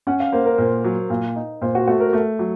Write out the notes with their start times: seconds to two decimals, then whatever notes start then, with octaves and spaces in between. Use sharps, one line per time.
0.07 C#4 F#5
0.20 F5
0.32 A#3 C5
0.46 A#4
0.58 A#2 C5
0.84 F#3
1.10 A#2
1.36 D#4
1.61 A#2 C5
1.75 F#4
1.88 A3 F#4
2.00 A#4
2.13 A3
2.39 F#3